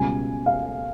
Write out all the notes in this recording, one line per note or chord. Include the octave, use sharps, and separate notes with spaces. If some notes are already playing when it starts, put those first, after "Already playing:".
Already playing: C#2 B2 G3 G#5
F5